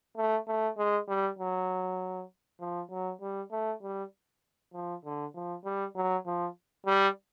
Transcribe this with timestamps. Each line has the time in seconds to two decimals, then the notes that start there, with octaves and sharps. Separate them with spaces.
0.17 A3
0.48 A3
0.78 G#3
1.09 G3
1.39 F#3
2.60 F3
2.91 F#3
3.21 G3
3.52 A3
3.82 G3
4.74 F3
5.05 D3
5.35 F3
5.65 G3
5.96 F#3
6.26 F3
6.87 G3